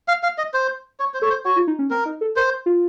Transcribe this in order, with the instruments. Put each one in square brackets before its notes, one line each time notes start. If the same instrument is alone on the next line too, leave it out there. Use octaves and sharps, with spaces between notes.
[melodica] F5
F5
D#5
C5
C#5
C5
[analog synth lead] A4 [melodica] C#5
[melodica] C5
[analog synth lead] F#4 [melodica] C#5
[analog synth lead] F4
D#4
C#4
[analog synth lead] C4 [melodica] A#4
[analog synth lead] D#4
A4
[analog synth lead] A#4 [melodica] C5
[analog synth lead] F4